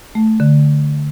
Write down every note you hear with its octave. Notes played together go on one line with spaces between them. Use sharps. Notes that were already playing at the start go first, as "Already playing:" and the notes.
A3
D3